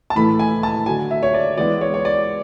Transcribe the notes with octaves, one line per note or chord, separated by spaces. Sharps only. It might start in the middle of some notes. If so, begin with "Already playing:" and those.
A5
A2 E3 A3 B5
G#5
A5
D3 F#3 A3 G#5
E5
C#5
D5
E3 G#3 B3 D5
C#5
C#5
D5